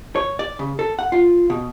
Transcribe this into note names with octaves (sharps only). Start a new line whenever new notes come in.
C#5
D5
C#3
A4
F#5
F4
B2